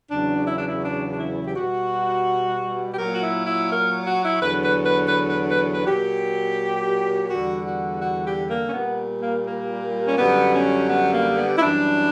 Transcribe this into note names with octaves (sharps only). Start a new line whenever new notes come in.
E2 C#3 F#3 D4
E4
D4
E4
D4
D4
E4
G4
B2 G3 F#4
G4
A#2 F#3 A#4
F#4
E4
E4
A#4
F#4
E4
E2 D3 F#3 B4
B4
B4
B4
B4
B4
B4
A#2 F#3 G4
E2 D3 G3 F#4
F#4
F#4
G4
A#3
C#4
A#2 G3 B3
A#3
A#3
C#4
F#2 D3 G3 B3
C#4
B3
A#3
B3
E4
F#2 E3 G3 D4